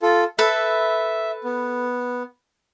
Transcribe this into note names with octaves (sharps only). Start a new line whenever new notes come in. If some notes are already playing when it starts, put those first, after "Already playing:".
F4 A4
A4 B4 E5
B3